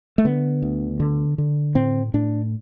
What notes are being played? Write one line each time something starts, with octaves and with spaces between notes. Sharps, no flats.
A3
D3 B3
D2
D3
D3
A2 C4
A2 D4